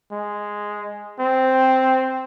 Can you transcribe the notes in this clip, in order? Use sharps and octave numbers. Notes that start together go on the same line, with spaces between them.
G#3
C4